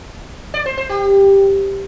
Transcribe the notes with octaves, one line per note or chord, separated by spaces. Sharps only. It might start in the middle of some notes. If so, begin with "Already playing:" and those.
D5
C5
C5
G4